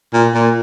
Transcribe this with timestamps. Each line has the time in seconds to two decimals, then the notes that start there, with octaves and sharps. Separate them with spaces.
0.13 A#2
0.34 A#2